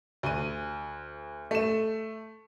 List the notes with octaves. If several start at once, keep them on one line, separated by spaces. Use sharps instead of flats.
D2 D#7
A3 E7